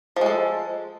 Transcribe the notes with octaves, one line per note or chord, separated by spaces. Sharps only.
F3 G#3 A4